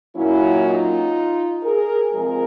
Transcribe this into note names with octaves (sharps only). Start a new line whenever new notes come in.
A#2 F#3 A#3 C#4 E4
D#4 F4
G#4 A#4
C3 F3 G#3 G#4 A#4